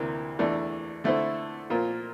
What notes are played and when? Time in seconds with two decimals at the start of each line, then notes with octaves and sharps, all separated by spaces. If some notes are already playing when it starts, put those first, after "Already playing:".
Already playing: D2 C3 E3 A#3
0.39 E2 E3 A3 D4
1.04 D3 A3 E4 A4 C5
1.70 A#2 F3 A#3 F4 A#4